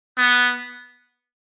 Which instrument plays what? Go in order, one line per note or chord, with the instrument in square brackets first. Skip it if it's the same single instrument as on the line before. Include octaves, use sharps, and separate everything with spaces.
[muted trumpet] B3